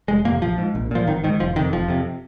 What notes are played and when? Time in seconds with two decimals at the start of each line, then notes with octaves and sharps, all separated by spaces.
0.08 F1 G#3
0.25 F2 C3 A#3
0.41 A#1 F3
0.58 G#2
0.75 A#1
0.91 A#2 F3
1.07 G#1 D#3
1.24 G#2 D#3
1.40 F1 F3
1.56 F2 C3 D#3
1.72 F1 F3
1.88 F2 C3